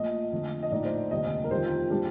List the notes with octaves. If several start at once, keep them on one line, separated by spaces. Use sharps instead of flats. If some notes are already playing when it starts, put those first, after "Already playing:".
Already playing: A#1 A#2 A3 D#5
F2 D3 F3 A3
D#5
A#1 A2 A3 D#4 D5
C5
F1 D#2 D3 G3 D#5
A#4
F2 D#3 G3 C5
A#2 G3 D4